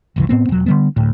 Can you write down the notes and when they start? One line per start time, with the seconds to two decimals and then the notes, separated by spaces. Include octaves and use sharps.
0.16 F#1 C2 E3
0.29 A2 B3 C4
0.49 E1 F#3
0.66 D3 G3 B3
0.96 D2 A2